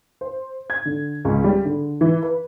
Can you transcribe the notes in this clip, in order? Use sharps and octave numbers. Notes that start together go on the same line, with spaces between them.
C5
G#6
D3
C#2
G3
D3
E3
B4